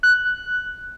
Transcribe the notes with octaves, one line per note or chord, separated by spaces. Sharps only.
F#6